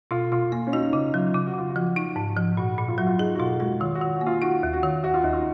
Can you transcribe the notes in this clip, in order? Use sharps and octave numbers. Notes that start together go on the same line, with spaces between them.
B2 F4
B2 F4
A#3 F4
C#4
D#4 F#4
C#3 D#4
F#3 F4
C#3
F#4
C#3 F4
F#4
F3
D#4
G#2
F3
A#2 F#4
A#2
F4
F#3 F#4
F4
D#4 G#4
F#4
B2 F4
G#3 F#4
D#3 F4
F#4
D#3
F#4
A#3
F4
D#4 F#4
D#2
F#4
D#3
D#2 F#4
F4
D#2 D#4
F4